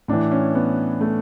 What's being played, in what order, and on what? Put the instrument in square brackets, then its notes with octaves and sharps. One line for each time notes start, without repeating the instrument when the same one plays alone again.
[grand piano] A2 E3 D4
C#4
B3
A3